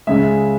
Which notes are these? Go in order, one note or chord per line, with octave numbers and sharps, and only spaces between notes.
C#2 C#3 G#3 E5